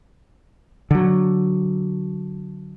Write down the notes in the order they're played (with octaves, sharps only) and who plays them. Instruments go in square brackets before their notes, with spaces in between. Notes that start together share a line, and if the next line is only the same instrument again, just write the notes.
[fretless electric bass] D3 F#3